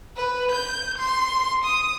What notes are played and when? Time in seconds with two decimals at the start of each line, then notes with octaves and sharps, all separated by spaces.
0.16 B4
0.52 G6
0.98 C6
1.64 D#6